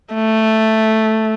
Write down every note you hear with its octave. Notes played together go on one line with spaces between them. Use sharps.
A3